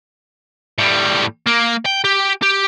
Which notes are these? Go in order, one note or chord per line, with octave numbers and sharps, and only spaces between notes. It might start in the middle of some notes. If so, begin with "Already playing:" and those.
A2 G3
A#3
G5
G4
G4